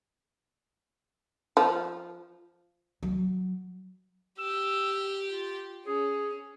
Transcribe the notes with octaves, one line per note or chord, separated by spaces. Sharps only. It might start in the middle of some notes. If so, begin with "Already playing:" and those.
F3
F#3
G4 E6
F4
C#4 G#4